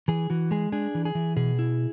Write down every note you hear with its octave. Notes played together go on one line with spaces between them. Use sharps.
E3 G#4
E3 F#4
G#3 G#4
D4 G#4
E3
G#4
E3
B2 G#4
E4